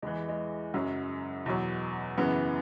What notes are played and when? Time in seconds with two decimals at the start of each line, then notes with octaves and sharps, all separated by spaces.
0.02 E2 E3 G#3
0.28 G#3
0.74 F#2 C#3 F#3
1.46 E2 B2 F#3
2.18 F#2 C#3 E3 B3